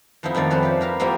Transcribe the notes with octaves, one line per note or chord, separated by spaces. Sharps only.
F2 F3 B3 D#4 E4
F2 D#3 A3 D5 F5
F3 G#3 C4 B4 C#5
G4 F5
E4 A#4 F5
F3 G3 A#3 B3 E4 G4